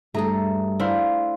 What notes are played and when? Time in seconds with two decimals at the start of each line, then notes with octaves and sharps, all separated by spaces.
0.15 G2 A3 G#4 A4 A#5
0.80 D4 E4 C5 F5